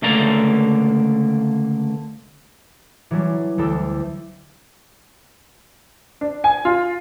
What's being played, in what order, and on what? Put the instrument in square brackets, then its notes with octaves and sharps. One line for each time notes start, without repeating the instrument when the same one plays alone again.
[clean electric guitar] C#2 D3 A3 A#3 D5 A#5
[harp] E3 F#3 G3 C#4 D4
D2 E3 A4 G5 E6
[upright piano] D4
G#5
F4